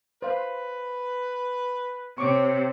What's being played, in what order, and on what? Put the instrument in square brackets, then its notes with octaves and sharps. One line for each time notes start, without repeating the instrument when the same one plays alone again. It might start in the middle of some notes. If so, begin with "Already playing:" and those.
[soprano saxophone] B4 [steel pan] C5 F5
[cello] C3 [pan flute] C#5 [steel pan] C#6 D6